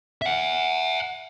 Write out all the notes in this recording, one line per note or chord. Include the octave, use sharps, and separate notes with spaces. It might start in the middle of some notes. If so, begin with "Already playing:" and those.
E5 F#5